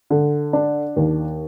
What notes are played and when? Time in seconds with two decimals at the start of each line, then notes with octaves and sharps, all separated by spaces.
0.10 D3
0.53 D4
0.96 D#2